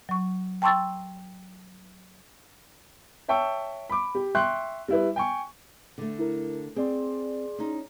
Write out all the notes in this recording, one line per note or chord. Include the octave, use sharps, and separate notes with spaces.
F#3 C#6
G5 A5 C6 C#6 E6 A6
C#5 E5 G5 A5 C#6 E6
B5 D6
G4
E5 G5 C6 C#6 F#6
G3 E4 B4
G5 G#5 C#6
D3 A3
E4 A#4
C4 G#4 D5 C6
C#4 D#4